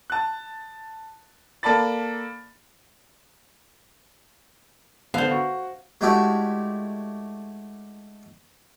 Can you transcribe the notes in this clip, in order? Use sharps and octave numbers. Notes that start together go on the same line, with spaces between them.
A5 F#6
A#3 A4 D5 A5 B5 A6
D3 B3 D4 C5 F5
F#4
G#3 A3 D4 E4 F#4 G4